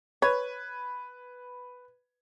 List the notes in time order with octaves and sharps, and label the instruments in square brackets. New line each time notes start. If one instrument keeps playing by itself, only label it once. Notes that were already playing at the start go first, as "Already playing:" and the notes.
[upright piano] B4 G#6 [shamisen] C#5